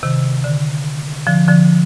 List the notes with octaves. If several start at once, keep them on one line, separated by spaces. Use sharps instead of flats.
C3 D#3
D3
D3 F3
D3 F3